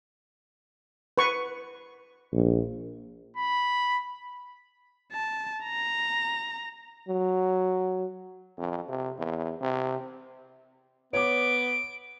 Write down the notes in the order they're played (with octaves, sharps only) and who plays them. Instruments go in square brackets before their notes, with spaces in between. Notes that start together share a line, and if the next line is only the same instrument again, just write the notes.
[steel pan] B4 C#6
[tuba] A#1
[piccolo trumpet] B5
[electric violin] A5
A#5
[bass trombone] F#3
F2
C3
E2
C3
[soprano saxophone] B3 [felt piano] C#5 D6 [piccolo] D7